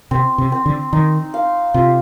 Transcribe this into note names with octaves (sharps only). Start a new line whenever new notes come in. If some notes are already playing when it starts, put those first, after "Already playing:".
C3 C4
C3
C4
D3
D#3 D#4
F5
C3 F4